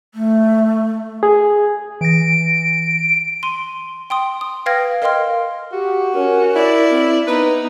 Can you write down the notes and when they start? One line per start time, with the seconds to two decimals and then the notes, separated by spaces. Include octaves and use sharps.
0.15 A3
1.23 G#4
2.01 E3 A#6 D7
3.43 C6 D#7
4.10 G5 C6 D#6
4.41 D#6
4.66 B4 F5 G5 F6 G#6 A#6
5.02 A#4 D#5 F5 G5 C6 F6
5.72 F#4 G4
6.14 C#4 A#4
6.55 E4 D5
6.90 C4
7.27 B3 D#4 B4